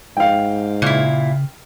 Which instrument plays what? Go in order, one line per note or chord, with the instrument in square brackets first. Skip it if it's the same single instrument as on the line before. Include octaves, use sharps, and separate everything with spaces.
[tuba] G#2 [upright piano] F5 G5
[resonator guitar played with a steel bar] A#2 E4 [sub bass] C#3